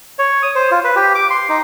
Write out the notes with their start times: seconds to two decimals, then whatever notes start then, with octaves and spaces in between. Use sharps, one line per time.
0.19 C#5
0.42 D#6
0.55 C5
0.71 F4
0.84 B4
0.96 G4
1.15 D6
1.30 C6
1.49 D#4